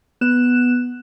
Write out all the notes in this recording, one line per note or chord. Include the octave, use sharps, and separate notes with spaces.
B3 F#6 E7